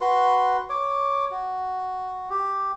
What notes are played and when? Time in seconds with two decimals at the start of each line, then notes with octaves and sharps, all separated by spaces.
0.01 F#4 B4 C6
0.70 C#5 D6
1.31 F#4
2.30 G4